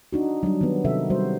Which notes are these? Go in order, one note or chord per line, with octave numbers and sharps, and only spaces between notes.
D4 D#4 F#4
F#3 G3 D4
D#3 B3
C3 D#3 D#4 F#4 A4 E5
F#3 G3 F#4 C5